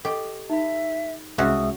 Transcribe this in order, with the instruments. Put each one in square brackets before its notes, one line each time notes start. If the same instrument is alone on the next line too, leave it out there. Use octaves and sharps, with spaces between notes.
[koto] G4 [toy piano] A4 D#5 C#6
[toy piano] D#4 B5 [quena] E5
[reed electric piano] C2 G#3 E5 [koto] C#4 F4 F#4 [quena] D#6